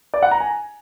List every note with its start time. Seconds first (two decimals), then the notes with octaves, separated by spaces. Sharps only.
0.14 D5
0.23 F#5
0.31 A#5
0.40 G#5